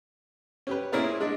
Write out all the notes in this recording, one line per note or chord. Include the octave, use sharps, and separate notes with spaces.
C#4 G4 B4
A#2 C#4 E4 G#4 A#4 D5
G#3 D4 D#5